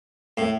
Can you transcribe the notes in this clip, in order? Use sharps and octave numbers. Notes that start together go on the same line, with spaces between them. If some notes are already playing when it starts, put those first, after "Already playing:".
A2